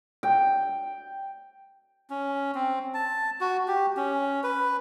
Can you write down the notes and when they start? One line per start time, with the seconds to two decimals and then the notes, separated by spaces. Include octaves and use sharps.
0.23 G5
2.10 C#4
2.55 C4
2.94 A5
3.41 F#4
3.68 G4
3.97 C#4
4.43 B4